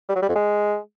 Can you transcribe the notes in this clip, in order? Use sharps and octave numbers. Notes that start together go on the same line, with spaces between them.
G3
F#3
G3
F2
G#3